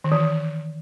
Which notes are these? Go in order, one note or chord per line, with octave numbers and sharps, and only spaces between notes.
D#3
E3